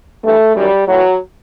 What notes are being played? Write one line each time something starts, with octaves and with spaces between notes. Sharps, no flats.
G2 E3 A3
F#2 D#3 F#3 G3
A2 E3 F#3